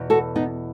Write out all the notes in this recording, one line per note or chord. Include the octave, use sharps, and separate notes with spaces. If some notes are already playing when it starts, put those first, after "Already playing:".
Already playing: E2 B2
F#4 A4
B3 D#4